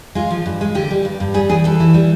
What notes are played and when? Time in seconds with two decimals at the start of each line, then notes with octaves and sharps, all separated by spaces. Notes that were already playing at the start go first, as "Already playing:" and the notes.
0.15 G#3 F4
0.30 F3
0.46 G2
0.61 G#3
0.75 D3 G4
0.91 G3
1.05 G2
1.20 G2
1.34 G3 G#4
1.49 E3 G#4
1.64 E3 A4
1.80 E3
1.94 G3